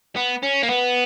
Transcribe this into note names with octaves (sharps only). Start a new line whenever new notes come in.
B3
C#4
A#3
B3